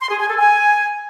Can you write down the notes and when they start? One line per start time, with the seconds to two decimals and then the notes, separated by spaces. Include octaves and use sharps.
0.01 C6
0.10 G#4
0.19 G#5
0.29 A4
0.38 G#5